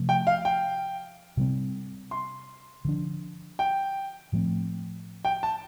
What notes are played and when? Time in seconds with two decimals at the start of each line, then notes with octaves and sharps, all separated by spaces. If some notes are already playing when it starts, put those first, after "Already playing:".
Already playing: C3 F3 A3
0.09 G5
0.27 F5
0.45 G5
1.37 C3 G3 C4
2.11 C6
2.85 D3 F3 D4
3.59 G5
4.32 A2 F3 A3 C4
5.25 G5
5.43 A5